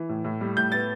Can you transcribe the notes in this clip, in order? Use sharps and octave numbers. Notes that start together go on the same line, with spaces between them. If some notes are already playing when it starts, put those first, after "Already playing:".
Already playing: E3
A2
A2
G3
A2 G6
B3 A6